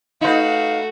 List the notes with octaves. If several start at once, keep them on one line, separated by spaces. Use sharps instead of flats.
A3 D#4 F#4 B4 F5